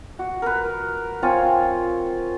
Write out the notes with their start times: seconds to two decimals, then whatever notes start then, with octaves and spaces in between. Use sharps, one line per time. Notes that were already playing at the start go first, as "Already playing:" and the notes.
0.19 F#4
0.42 A#4 B4
1.22 C4 F4 C#5 G#5